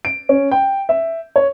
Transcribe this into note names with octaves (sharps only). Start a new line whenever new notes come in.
D7
C#4
G5
E5
C#5